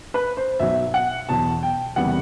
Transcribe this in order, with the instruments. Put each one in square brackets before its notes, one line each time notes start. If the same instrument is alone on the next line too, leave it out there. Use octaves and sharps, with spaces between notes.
[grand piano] B4
C5
B1 B2 F#3 E5
F#5
E2 B2 F#3 A5
G5
F#1 E2 C3 G3 B3 F#5